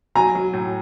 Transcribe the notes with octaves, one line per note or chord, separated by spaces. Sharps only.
F#3 G#5 A#5
F#3
A2